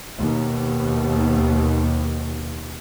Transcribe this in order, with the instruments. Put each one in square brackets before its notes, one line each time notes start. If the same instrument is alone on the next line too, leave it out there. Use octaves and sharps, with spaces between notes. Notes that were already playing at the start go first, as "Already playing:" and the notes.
[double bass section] D#2 B2